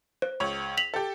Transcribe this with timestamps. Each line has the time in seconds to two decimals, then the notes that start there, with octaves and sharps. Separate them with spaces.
0.22 C5
0.40 C#2 C#5
0.77 B6 F7 F#7
0.94 G4 A4